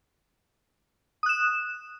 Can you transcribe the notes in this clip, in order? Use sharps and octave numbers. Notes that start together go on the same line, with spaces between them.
D#6 F#6 E7